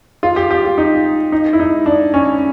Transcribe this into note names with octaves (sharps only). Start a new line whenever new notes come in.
F4
G4
G4
F4
D#4
D#4
E4
D#4
D4
C#4